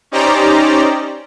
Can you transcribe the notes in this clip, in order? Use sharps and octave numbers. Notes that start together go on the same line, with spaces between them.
C#4 D#4 G4 C5 D5 A#5